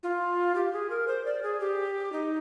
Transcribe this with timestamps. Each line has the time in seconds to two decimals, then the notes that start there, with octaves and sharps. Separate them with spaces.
0.03 F4
0.55 G4
0.73 G#4
0.90 A#4
1.07 C5
1.25 D5
1.43 G#4
1.60 G4
2.12 D#4